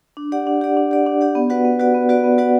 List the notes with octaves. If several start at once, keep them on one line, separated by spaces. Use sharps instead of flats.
D4
G4 D5 F#5
D4
G4 D5 F#5
D4
G4 D5 F#5
D4
G4 D5 F#5
B3
F#4 B4 D5 F#5
B3
F#4 B4 D5 F#5
B3
F#4 B4 D5 F#5
B3
F#4 B4 D5 F#5